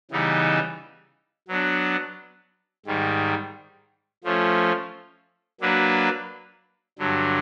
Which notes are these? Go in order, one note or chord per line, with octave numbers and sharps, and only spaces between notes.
C#3 E3 G3 B3 D#4
F#3 B3 D4
G#2 D#3 G3
F3 A3 C#4
F#3 A#3 D4 F#4 B4
G2 D3 F#3